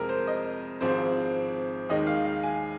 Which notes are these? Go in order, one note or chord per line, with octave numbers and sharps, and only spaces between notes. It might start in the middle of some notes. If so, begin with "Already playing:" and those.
Already playing: F2 C3 G#3 A#4
C5
D#5
G#1 G#2 F3 G#3 C4 C5
D#2 D#3 G#3 D#4 D#5
F5
F5
G#5